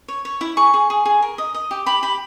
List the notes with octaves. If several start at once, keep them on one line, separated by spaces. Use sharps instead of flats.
C#5
C#5
E4
G#4 C#6
G#4
G#4
G#4
A#4
D#5
D#5
G4
G4 B5
G4 B5